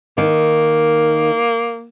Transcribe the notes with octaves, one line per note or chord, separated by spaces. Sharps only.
D#3 A#3